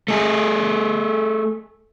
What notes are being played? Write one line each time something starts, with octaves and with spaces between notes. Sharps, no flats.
A3 G#4